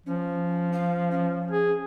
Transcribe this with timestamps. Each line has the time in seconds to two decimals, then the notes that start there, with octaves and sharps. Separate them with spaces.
0.06 F3 C#4
0.73 F5
1.11 C#4
1.51 G#4